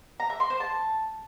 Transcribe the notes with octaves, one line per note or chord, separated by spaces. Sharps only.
A#5
E5
C6
C5
A5